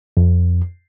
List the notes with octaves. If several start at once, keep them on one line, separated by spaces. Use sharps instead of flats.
F2